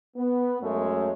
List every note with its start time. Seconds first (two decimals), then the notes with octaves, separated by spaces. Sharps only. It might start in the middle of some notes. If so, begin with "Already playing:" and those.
0.17 B3
0.62 F#2 G#3 A3 C#5